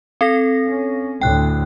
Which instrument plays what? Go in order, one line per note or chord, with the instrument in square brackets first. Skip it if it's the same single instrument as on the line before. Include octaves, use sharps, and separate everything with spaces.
[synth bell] C4 A4 A#6
[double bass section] C#4
[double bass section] D2 A2 D3 [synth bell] G5 F#6